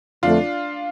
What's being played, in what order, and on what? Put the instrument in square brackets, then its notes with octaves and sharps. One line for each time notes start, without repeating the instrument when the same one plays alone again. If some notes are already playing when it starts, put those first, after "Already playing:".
[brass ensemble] F2 D3 F3 A3 [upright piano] D4 F4